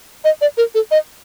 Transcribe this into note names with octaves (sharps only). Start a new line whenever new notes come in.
D#5
D5
A#4
A4
D#5